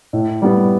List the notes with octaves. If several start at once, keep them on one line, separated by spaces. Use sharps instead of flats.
A2
G3 B3